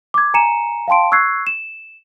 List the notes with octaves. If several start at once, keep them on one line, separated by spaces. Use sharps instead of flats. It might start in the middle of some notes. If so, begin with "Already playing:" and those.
D6 G#6
G#5 A#5 C#7 D#7 E7
F5 G5 A5 C6 D7
C#6 E6 F#6 G#6 C7
E7